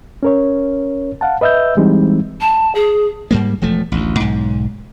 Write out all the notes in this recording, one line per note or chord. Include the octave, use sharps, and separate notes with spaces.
C#4 A#4 C#5
F5 F#5 A5
B4 D#5 E5 E6 G6
E3 G3 G#3 C4 D#4
A5
G#4
G#2 G3 A#3
E1 F3 A3
A1 D2
B1 G#2